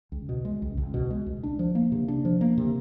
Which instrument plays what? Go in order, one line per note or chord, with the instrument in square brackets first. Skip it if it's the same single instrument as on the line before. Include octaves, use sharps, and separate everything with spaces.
[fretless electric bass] C#2
B2
G#3
C#2
C#2
B2
G#3
C#2
D4
F3
A#3
C3
D4
F3
A#3
C3